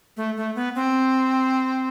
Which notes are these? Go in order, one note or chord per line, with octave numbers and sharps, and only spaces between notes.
A3
A3
B3
C4